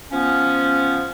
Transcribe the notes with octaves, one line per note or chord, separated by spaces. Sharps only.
F3 B3 C#4